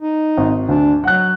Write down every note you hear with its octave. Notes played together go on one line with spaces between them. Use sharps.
D#4
G#1
D2 D4
F#3 F#5 F#6